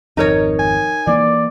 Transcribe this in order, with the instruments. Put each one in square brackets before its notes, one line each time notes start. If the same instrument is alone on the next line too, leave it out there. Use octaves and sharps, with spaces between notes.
[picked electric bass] G#1 F2 [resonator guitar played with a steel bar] D#4 A#4 C#5
[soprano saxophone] G#5
[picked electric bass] E3 A#3 [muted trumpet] D5